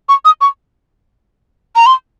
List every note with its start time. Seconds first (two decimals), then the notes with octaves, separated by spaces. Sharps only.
0.09 C#6
0.25 D#6
0.41 C#6
1.76 A#5
1.86 C6